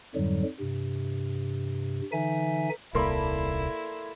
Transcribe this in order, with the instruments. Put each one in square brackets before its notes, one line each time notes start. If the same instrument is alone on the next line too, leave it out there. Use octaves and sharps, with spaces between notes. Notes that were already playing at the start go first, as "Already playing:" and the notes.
[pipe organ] F2 G#2 D3 F#3 G3
G2 C3
D3 E3 D#4 E5 G#5
[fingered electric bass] D#1 C2 [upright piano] A#3 C6 [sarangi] E4 [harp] A4 D5 B5